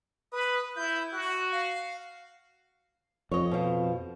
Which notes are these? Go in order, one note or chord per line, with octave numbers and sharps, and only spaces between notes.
B4 D#6
E4 G6
F#4 F#6
F5
F2 C#5 D#5
B2 F3